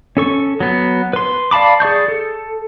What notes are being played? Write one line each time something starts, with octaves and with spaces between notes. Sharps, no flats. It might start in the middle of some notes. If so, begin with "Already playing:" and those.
C#4 A4 C#6
F#3 B3
B4 C6
D5 F5 A5 B5 D6
G#4 D5 C#6 G6
A4